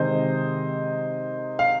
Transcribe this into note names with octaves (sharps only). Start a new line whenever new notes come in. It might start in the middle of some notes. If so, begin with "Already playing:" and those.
Already playing: C3 D#3 G#3 C5 D#5
F5